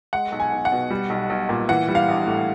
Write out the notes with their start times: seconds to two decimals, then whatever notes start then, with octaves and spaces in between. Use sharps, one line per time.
0.13 G#3 F#5
0.32 B1
0.40 G#5
0.53 B1
0.65 F#5
0.72 B2
0.90 G3
1.10 B1
1.30 B1
1.49 A#2
1.69 E3 F#5
1.88 G3
1.95 F5
2.08 A#1
2.27 A2